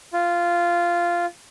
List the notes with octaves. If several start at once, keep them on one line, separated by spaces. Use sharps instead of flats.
F4